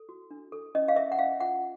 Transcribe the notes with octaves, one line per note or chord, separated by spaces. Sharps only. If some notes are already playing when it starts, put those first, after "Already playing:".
Already playing: A4
F#4
D4
A4
C#4 D#5
F5
A#4 E5
F#5
C#4 F5
F4 F#5